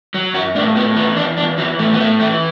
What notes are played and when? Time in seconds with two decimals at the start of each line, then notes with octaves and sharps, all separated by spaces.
0.14 F#3
0.34 F#2 F#4
0.55 A2 D4
0.76 A2 B3
0.96 E3 B3
1.17 E2 D4
1.37 E2 D4
1.58 E3 F#3
1.79 A2 A3
1.93 B3
1.99 A2 A3
2.20 E3 A3